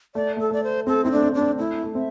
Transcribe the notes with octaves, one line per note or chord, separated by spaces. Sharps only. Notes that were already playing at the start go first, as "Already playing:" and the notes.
A3 D5
A3 A4
A3 D5
C5
C4 A4
C4 E4
A3 D4
C4
A3 D4
C4
A3 E4
A3
C4 E5